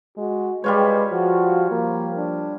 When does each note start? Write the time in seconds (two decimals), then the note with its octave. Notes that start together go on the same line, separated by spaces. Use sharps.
0.18 G#3 F#4
0.64 G3 G#3 F4 B4 C#5
1.12 F3 F#4
1.71 F3 A#3
2.17 D4